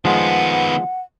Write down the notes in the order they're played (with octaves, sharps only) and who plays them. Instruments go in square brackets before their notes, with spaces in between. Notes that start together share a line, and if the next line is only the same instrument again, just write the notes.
[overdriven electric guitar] D#3 B3 [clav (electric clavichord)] F3 G#3 [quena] F#5